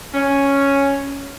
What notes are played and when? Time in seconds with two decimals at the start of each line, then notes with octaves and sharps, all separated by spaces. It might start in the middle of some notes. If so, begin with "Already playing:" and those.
0.14 C#4